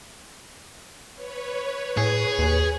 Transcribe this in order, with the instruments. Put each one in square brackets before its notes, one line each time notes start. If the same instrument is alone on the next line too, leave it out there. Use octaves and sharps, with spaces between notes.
[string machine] B4 C#5
[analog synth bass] A2 [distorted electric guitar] G#4
[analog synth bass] D#2